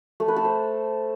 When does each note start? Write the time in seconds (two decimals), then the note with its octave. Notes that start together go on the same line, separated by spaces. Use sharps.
0.20 A3
0.28 B4
0.36 A4
0.45 C5